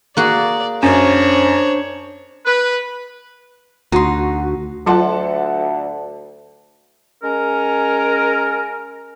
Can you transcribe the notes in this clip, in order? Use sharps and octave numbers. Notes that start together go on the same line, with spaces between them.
A#3 F#4 G#4 D5
F#2 D4 C5 C#5
B4
D2 D#4 F#4 C6
D2 F#3 F4 A4 F#5 A5 C6
G#3 C#4 A#4